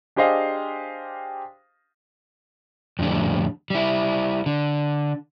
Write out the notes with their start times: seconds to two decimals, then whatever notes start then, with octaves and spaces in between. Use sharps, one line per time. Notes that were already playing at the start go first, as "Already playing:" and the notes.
0.16 D4 G4 G#4 C5 D#5 F5
2.99 F2 A2 D3 G3
3.70 G3 E4
4.46 D3